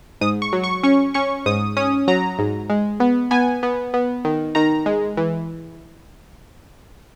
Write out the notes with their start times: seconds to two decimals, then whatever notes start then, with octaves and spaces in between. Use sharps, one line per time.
0.21 G#2 D#6
0.42 C#6
0.53 F#3
0.64 C#6
0.83 C#4 C#6
1.14 C#4 C#6
1.46 G#2 D#6
1.77 C#4 D#6
2.08 F#3 A#5
2.39 G#2
2.70 G#3
3.00 B3
3.31 B3 G#5
3.63 B3
3.94 B3
4.25 D#3
4.55 D#3 A#5
4.86 G#3
5.17 E3